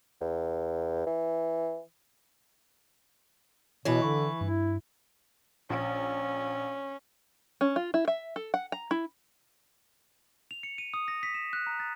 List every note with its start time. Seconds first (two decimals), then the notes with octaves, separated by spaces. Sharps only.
0.21 E2
1.06 E3
3.85 B2 E3 B4 C#5 D#5 B5
4.02 D3 B5 C#6
4.41 G2 E4
5.70 A#1 C#4
7.61 C#4
7.76 F4
7.94 E4
8.08 E5
8.36 A4
8.54 F#5
8.72 A#5
8.91 E4
10.51 F7
10.63 C#7
10.78 D#7
10.94 D#6
11.08 A#6
11.23 B6
11.35 E7
11.53 F#6
11.67 A#5
11.80 A6